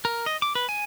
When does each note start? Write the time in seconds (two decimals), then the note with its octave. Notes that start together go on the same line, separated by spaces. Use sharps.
0.05 A#4
0.26 D#5
0.42 D6
0.55 B4
0.69 G#5